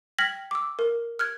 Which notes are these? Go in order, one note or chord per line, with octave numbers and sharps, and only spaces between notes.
G5 F6 G#6 A#6 B6 F#7
D6 E6
A#4
F6 F#6 G#6